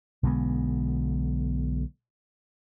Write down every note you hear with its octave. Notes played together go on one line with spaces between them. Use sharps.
B1 D3 G#3 B3